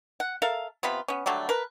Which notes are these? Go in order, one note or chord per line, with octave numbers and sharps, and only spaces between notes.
F#5
A4 A#4 E5 F5
C3 B3 F4 B5
B3 C#4
D3 F#3 G3 A3
A#4 B4